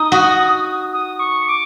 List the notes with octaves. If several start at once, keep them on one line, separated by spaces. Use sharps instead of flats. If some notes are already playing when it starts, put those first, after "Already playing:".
Already playing: D#4 D#6
F#4
D#6
C#6
D6